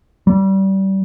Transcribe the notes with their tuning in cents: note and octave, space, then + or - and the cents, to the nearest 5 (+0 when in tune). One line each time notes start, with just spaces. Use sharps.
G3 -25